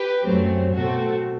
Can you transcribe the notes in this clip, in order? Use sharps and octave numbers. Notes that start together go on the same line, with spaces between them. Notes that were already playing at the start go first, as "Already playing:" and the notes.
Already playing: G4 B4
F#2 F#3 A3 C4
B2 A3 C4 F#4 A4